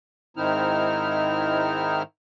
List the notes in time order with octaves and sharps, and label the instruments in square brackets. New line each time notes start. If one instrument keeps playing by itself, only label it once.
[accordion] G#2 D#3 C4 D#4 E4 F6